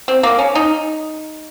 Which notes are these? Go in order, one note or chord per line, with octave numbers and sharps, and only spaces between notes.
C4
A#3
C#4
D#4